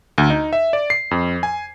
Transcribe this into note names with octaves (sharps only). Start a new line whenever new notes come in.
D2
D#4
E5
D5
C7
F2
G#5